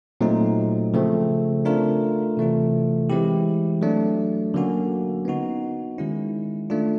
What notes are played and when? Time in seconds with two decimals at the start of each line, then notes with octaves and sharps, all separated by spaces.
0.21 A#2 F#3 A3 C4 D#4
0.94 C#3 F3 A3 C4
1.65 A3 D4 F4 A#4
2.37 C3 E3 A3 C4 F4
3.10 E3 G#3 C4 E4 G4
3.81 F#3 A3 D4
4.54 D3 F#3 A#3 C#4 F#4
5.25 B3 D#4 F#4
5.98 D#3 G#3 C#4 E4
6.70 A3 D4 F4